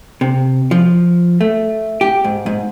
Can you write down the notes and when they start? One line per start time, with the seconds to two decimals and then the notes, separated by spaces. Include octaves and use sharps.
0.21 C3
0.71 F3
1.41 A3
2.01 G4
2.24 G#2
2.46 G#2